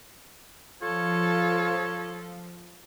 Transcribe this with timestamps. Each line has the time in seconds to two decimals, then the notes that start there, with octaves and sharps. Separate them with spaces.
0.82 F3 F4 A4 C#5